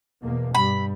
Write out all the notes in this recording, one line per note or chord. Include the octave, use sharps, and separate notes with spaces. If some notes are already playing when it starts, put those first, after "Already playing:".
E2 B2 A#3
G2 G3 B5